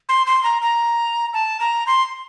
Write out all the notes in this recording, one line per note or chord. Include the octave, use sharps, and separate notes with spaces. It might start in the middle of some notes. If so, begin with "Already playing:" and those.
C6
C6
A#5
A#5
A5
A#5
C6